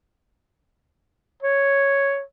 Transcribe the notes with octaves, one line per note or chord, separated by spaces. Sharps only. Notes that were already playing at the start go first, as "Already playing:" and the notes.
C#5